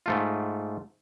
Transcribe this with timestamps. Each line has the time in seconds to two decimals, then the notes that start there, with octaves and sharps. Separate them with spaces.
0.06 G#2 A3 F4